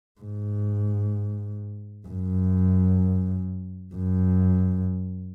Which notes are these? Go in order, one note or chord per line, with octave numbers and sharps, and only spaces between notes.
G#2
F#2
F#2